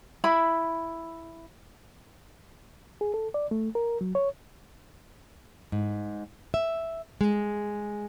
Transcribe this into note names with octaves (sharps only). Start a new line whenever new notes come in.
E4 B5
G#4
A4
D5
A3
A#4
F#3
C#5
G#2
E5
G#3